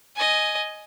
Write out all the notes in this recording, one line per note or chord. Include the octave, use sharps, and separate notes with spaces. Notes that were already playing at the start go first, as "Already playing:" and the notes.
D#5 G#5